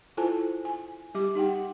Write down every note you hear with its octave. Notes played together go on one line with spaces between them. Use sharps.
E4 F4 A4 C5 G#5 A5
G#5
G3 G4 D6
D#4 G4 F#5 G5